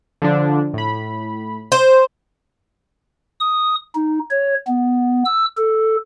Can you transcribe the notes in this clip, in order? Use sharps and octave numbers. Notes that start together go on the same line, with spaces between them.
D3 F3 D4
A2 B5
C5
D#6
D#4
C#5
B3
E6
A4